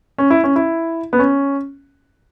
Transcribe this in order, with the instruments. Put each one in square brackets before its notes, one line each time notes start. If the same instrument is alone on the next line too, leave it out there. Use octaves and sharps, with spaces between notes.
[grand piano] C#4
E4
C#4
E4
B3
C#4